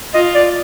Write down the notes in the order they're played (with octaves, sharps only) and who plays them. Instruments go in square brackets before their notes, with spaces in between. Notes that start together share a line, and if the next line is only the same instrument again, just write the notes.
[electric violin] F4 [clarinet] D#5
[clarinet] D5